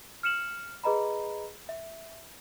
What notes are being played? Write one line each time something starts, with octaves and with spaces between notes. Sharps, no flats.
F6 C#7 E7 F#7
G#4 B4 D#5 A#5 B5
E5